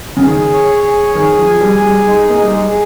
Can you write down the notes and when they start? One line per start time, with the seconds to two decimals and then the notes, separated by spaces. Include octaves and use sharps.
0.17 C#3
0.22 D#3 G#4
0.53 C#5
0.84 G#4
1.14 D#3 G#4
1.38 F3
1.45 G#5
1.61 G3
1.75 G#4
1.84 G3
2.07 G#3 D#4
2.29 A#3
2.37 D#4
2.42 G3
2.53 G#3
2.68 G#4